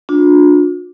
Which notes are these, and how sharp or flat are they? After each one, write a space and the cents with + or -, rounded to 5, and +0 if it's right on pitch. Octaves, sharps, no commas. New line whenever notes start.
D4 +0 F4 +45